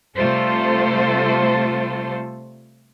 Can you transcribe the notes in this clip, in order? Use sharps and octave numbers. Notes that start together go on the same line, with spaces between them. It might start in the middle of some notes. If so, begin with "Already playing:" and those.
C3 G3 A3 F4 A4 C5